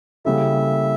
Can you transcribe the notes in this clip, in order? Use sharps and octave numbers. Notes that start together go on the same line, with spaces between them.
C#3 G3 A#3 E4 A4 E5